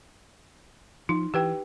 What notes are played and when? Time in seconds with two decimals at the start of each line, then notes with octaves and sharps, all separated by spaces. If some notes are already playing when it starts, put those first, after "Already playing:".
1.09 F3 D#4
1.34 E3 G4 B4 G5